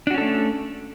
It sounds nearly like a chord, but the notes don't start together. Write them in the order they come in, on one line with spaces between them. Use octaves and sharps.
D4 F#4 C#4 A4 A3